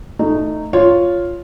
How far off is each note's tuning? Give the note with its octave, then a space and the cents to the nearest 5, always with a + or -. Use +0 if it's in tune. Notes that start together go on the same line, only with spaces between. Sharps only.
A3 +5 D#4 -10
F4 +0 C#5 +0